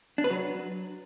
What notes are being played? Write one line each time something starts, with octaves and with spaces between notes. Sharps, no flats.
D4
B4
F#3